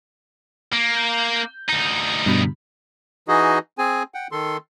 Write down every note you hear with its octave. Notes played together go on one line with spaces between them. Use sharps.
A#3
G6
D2 D#4
G2 B2 B5
E3 D#4 F#4 G#4 D#5
C4 G#4 G#5
F#5 G5
D#3 A4 C6